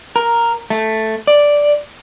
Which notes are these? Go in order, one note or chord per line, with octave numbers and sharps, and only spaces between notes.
A#4
A3
D5